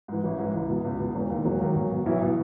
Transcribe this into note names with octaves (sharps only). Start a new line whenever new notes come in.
G#2 E3
A1 E3 E4
G#2 E3
C#2
B2
C#2
B2
E1
D#2 D#3
E1 F#3 F#4
D#2 D#3
B1
B2
B1 E3 E4
B2